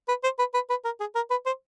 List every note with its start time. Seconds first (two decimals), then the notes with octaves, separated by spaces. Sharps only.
0.08 B4
0.23 C5
0.39 B4
0.54 B4
0.69 B4
0.85 A#4
1.00 G#4
1.15 A#4
1.30 B4
1.46 C5